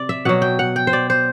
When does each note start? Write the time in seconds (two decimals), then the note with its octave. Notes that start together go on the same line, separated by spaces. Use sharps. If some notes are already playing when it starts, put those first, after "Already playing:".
Already playing: C3 D5
0.09 E5
0.25 B2 F#3 F#5
0.42 G5
0.59 F#5
0.76 G5
0.87 C5
0.93 D5
1.10 C5